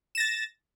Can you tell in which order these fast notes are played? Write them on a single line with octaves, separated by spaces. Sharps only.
E7 A#6 A6